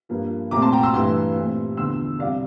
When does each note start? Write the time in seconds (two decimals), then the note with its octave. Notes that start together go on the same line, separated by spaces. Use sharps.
0.09 G2 F3 A#3
0.51 C2 A#2 A3 C4 A#5 D6
0.62 A5 C6
0.72 G5 A#5
0.83 C6 E6
0.94 G2 E3 A3 C6 E6
1.36 A#2 A3 C4
1.77 E2 D3 F3 C6 E6
2.19 C2 C3 G3 D5 F5